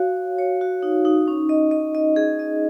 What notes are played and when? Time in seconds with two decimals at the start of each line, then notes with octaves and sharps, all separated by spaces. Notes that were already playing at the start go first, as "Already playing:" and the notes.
Already playing: F#4 C#5 F5
0.17 C#5
0.38 C#5
0.61 F#4
0.83 D#4
1.05 D#4
1.28 C#4
1.49 D#5
1.71 D#5
1.95 D#5
2.16 G#4
2.39 D#5